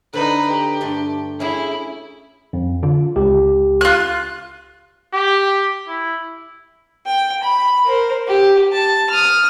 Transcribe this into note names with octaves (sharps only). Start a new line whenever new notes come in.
D3 D#4 B4 C5
G4
G2 A3 C6
C#4 E4 G#4
F2
D3 F4
C#2 G4
F4 F#6
G4
E4
G5
B5
A#4 C5
G4
A5
D#6 F6